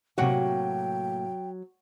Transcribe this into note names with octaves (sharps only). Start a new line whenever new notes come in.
A2 C3 F#3 A#3 F#4 F#5 G5